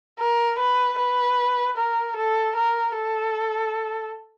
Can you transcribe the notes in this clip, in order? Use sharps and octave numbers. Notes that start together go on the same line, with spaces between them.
A#4
B4
B4
A#4
A4
A#4
A4